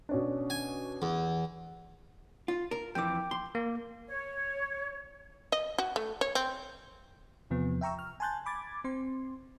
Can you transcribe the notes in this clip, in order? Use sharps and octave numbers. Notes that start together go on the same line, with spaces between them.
B2 C#4 D4
G#5
E2
F4
A#4
F2 E3 G5 D6
C6
A#3
C#5
D#5
F#4
A3
C#5
C4
E2 C3 F3 B3
E5 G5 A#5 C#6 E6
F6
G#5 A5 C6 F#6 G6 A6
B5 D6 G#6 A6
C4 C6